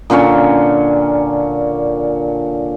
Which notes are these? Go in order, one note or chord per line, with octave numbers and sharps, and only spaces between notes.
A#2 D3 C#4 C#5